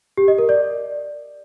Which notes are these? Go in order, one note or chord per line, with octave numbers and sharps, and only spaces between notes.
G4
D#5
A#4
D5